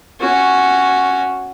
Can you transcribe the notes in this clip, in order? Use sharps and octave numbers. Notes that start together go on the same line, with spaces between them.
C#4 F#4